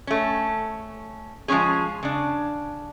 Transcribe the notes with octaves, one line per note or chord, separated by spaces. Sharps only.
A3 C#4
F3 G#3 C4 C#4 G#4
C#3 D4